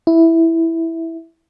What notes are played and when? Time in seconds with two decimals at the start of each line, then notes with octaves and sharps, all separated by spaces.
0.07 E4